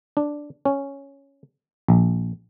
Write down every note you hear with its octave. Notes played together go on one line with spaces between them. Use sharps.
D4
C#4
A#1